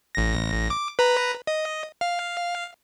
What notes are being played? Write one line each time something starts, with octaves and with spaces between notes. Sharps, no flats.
A1 A#6
D6
B4 A#5
D#5
F5